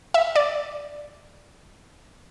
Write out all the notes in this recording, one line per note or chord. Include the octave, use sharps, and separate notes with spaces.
E5
D5